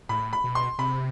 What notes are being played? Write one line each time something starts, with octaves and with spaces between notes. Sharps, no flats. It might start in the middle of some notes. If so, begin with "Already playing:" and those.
A2 B5
B5
B2
C6
C3 B5